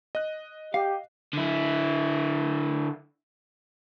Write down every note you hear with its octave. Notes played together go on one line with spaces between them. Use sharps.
D#5 F#6
G4 F5
D3 E4